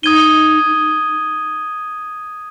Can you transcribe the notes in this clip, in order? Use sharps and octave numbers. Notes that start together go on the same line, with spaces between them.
D#4 D#6 G#6 D#7 G7